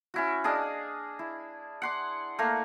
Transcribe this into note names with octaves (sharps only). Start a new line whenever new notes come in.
C#4 E4 F#4
D4 G#4 D#5 F5
E4
F#5 C6 D6
A3 A#3 A#4